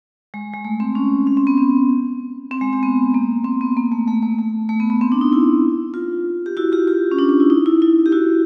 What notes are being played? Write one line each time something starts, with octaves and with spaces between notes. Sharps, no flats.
G#3
G#3
A3
C4
C#4
C#4
C4
B3
C4
C4
G#3
C4
B3
A#3
C4
B3
A#3
A3
A3
A3
A3
A3
B3
B3
C4
D4
D#4
E4
F4
G4
E4 F#4
F4 G4
F4 G4
C#4
D4
D4
E4
D#4
E4
E4
G4
E4 F#4